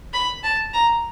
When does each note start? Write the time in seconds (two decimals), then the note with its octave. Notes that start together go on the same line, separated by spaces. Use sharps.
0.13 B5
0.44 A5
0.73 A#5